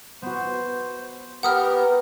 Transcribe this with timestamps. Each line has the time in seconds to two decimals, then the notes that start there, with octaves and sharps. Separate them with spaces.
0.22 B3 F#4 C5
1.43 B3 G4 A#4 B4 F#5 D#6 F6